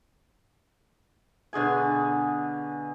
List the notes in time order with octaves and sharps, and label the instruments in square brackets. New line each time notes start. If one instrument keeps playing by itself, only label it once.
[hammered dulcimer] B2 D3 G#4 G#5